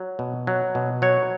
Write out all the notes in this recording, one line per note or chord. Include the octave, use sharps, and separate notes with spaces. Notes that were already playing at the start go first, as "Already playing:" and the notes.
Already playing: F#3
B2
F#3
B2
F#3 C#5